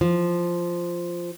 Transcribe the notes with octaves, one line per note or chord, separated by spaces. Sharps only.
F3